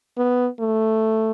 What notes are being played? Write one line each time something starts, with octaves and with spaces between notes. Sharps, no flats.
B3
A3